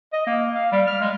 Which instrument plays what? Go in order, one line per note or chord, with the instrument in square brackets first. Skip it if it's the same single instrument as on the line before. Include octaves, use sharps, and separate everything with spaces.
[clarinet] D#5
A#3
F5
G3
F6
G#3